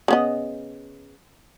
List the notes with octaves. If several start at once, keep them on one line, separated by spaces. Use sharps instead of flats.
C#3 B3 D#5